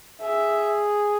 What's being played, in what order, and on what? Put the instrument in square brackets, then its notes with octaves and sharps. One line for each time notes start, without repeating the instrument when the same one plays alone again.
[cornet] G#4 [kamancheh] E5